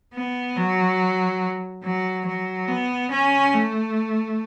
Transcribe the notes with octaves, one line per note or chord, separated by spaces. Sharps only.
B3
F#3
F#3
F#3
B3
C#4
A3